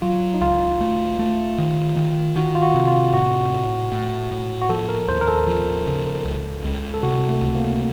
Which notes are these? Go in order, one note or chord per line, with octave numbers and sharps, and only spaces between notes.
F#3 F4
D#4
C#2 F4
A3
A3
D#3
D#3
D#3 F#4
F4
F#4
C3
F4
A2 F#4
A2
A2
A2
F#4
F3 A4
A#4
D#2 C5
A#4
A4
F3
C#3
C#2
C#2
A4
C3 F#4
A3
C#2
A#3